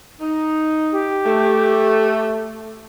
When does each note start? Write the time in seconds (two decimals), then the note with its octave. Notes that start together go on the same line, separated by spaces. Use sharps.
0.20 D#4
0.92 G4
1.25 A3